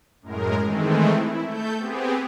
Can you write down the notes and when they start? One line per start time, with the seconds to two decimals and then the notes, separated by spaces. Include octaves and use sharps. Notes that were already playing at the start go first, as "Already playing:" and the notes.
0.22 F#2 A2 G#3 A#4
0.64 D#3 E3 G#3 A3 C4
1.14 E4
1.46 A3 A4 G6
1.78 B3 C4 G4 G#4